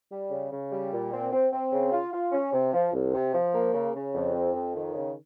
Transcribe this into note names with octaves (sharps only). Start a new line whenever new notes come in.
G3
C#3
C#3
G3
A#2
C4
C4
C4
C#3
F4
F4
C#4
C3
F3
C2
C3
F3
A#3
C#3
C#3
F2
C4
F2
D#3
C#3